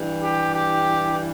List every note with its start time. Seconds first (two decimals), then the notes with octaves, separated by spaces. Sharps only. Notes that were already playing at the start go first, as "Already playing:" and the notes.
Already playing: G2 E3
0.22 G4
0.53 G4